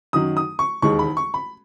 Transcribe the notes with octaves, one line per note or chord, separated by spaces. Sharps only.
F#2 D#3 F#3 D#6
D#6
C#6
E1 D#2 D#3 G#3 C#6
B5
C#6
B5